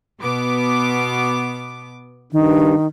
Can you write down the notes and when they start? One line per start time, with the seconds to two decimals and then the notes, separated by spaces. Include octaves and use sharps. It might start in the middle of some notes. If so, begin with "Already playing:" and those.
0.20 B2 B3 D6
2.33 G2 D#3